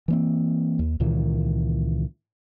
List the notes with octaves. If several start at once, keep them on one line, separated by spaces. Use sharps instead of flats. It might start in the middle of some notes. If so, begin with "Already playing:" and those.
E3 A#3 C4
D#2
C#2 A#2 D#3 E3